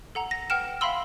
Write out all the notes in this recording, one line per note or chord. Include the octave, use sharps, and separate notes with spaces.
A4 F#5 A#5
A#6
B4 F#5 G5 F6 E7
E5 F5 G5 B5 C6 E6